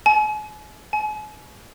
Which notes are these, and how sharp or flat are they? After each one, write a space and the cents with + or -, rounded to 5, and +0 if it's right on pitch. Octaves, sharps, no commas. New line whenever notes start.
G#5 +40
G#5 +40